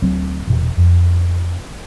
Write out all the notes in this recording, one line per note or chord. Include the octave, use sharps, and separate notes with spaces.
D2 F#3 C4
E1 A#2 E3
F2